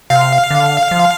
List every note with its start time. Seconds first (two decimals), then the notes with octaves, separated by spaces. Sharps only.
0.10 C3 F5
0.51 D3
0.91 F3